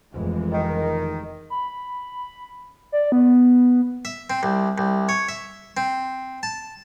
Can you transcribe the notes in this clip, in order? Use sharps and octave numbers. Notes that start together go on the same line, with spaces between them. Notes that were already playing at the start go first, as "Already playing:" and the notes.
F1 E3 G#3
D#3
B5
D5
B3
E5
C4
C2
C2
C#5
E5
C4
A5